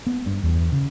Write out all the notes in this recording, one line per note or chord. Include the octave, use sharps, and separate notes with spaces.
B3
G2
E2
C#3